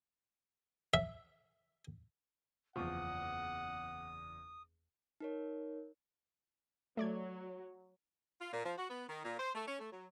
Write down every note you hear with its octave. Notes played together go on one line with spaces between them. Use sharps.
E5
F#1 E2 F3 F#5 C#6 D#6
D#4 A#4 C#5
F#3 A3 D5 G#6
F4
A#2
F3
F#4
B3
D#3
A#2
C5
A3
C#4
A3
F#3